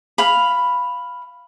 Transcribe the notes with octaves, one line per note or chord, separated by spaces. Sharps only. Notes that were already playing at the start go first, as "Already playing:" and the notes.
F5 B5